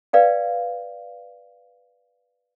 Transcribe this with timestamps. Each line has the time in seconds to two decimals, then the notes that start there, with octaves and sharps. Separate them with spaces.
0.13 B4 D5 F5 G5